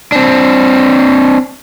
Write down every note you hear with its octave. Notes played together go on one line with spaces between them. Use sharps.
C4 D4